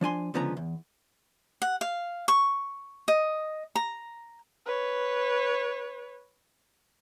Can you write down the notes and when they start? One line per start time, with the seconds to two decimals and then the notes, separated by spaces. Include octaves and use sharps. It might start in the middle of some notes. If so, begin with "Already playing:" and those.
0.01 F3 D4 G#5 C6
0.34 C#2 D3 F3 B3 C#4 A#5
0.57 E2
1.62 F#5
1.81 F5
2.28 C#6
3.08 D#5
3.75 A#5
4.66 B4 C#5